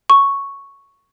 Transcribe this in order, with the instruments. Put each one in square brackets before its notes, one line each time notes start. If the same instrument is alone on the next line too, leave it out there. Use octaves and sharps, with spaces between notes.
[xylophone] C#6